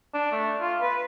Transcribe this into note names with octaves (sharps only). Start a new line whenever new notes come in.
D4
A3
F4
B4